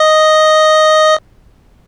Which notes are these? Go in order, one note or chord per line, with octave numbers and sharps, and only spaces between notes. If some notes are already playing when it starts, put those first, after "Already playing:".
Already playing: D#5